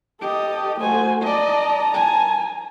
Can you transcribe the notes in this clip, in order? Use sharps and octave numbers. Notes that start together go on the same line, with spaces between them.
G4 A4 D#5
A3 F#4 C5 G#5
D5 D#5 A5 A#5
G#5